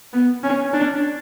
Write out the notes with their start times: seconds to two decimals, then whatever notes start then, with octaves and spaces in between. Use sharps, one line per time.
0.13 B3
0.44 C#4
0.74 D4